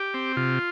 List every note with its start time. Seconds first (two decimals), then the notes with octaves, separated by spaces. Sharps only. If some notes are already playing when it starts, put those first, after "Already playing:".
Already playing: G4
0.14 C4
0.37 C3 F4